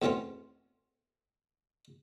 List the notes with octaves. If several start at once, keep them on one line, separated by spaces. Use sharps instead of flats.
E2 B2 A3 C4 C#4